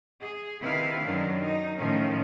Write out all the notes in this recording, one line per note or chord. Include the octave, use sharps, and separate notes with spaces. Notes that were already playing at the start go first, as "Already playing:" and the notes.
G#4
C3 D#3 E4 B4 F5
F#2 D#3 F#3 D4
D#4
A2 D#3 F3 C#4